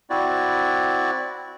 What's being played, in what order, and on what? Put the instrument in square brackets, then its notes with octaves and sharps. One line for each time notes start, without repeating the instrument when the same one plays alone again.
[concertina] C4 E4 F#4 D5